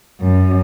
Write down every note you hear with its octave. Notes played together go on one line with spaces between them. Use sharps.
F#2